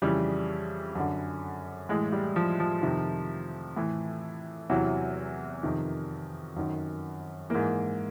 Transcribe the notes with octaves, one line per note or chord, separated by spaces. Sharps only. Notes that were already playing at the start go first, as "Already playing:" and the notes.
F2 C#3 E3 G3
F#2 D3
A2 E3 G#3
G3
F3
F3
F2 C3 D#3
A2 E3
E2 C3 E3 F#3
F2 C3 D#3
F#2 D#3
G#2 E3 A#3